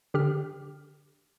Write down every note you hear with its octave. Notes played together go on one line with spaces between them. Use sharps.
D3 G4 F6